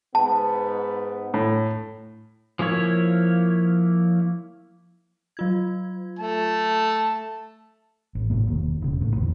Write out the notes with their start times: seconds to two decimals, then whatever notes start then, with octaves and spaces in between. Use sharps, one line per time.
0.15 G#2 B3 A5
1.34 A2
2.59 F3 A#3 E4 C#5
5.37 F#3 F4 G#6
6.19 A3 A5
8.15 A1
8.30 G1 A2 C3 A#3
8.46 E1 D#2 A#3
8.82 E1 C#3
9.01 A1 A2 D3
9.17 E2 A#2 E3